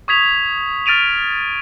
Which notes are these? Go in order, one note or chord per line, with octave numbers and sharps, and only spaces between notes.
C#6 D#6 G#6 B6 F7
F6 A6 D7 D#7 F7